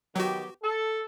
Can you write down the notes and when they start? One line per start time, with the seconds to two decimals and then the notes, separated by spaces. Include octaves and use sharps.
0.16 D#3 F#3 B3 F#4 G4
0.63 A4